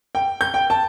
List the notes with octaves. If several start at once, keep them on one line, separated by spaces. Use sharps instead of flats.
G5
G6
G5
A5